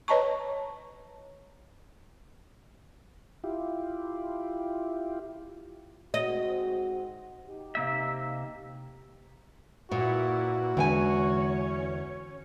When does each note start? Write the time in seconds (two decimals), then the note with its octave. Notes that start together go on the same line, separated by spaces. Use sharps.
0.08 B4 C#5 D#5 A5 A#5 C#6
3.44 E4 F4 G4
6.14 G#2 C4 F#4 D#5
7.45 D#4 G4
7.75 C3 A#3 E5
9.91 A#2 A#3 E4 F#4 B4
10.77 E2 D3 G#3 C#4 C#5 G5 G#5